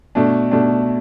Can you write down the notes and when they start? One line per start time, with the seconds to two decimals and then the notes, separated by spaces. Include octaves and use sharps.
0.15 B2 A3 D4
0.51 B2 A3 D4